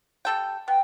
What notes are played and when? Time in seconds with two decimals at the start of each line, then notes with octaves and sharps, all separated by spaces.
0.25 G3 A4 G5
0.68 B3 G5